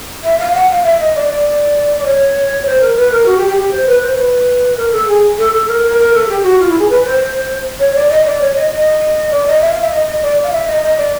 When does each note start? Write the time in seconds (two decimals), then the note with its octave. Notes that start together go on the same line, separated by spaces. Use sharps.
0.24 E5
0.39 F5
0.54 F#5
0.69 F5
0.84 E5
1.00 D#5
1.15 D5
1.29 D5
1.99 D5
2.05 C#5
2.65 C5
2.81 A#4
2.96 B4
3.11 A#4
3.26 F#4
3.37 G4
3.47 G4
3.57 G4
3.72 C5
3.87 B4
4.02 C5
4.17 B4
4.77 A#4
4.93 A4
5.08 G#4
5.38 A4
5.53 A4
5.68 A#4
5.83 A#4
5.98 A#4
6.14 A4
6.29 G4
6.43 F#4
6.59 F4
6.69 E4
6.79 G#4
6.89 B4
7.04 C5
7.80 C#5
7.95 D5
8.10 D#5
8.25 D5
8.40 C#5
8.55 D#5
8.71 D#5
9.31 D5
9.46 D#5
9.61 E5
9.71 F5
9.81 E5
9.91 D#5
10.07 D#5
10.22 D5
10.44 F5
10.52 E5
10.67 D#5
10.83 D#5
10.97 D5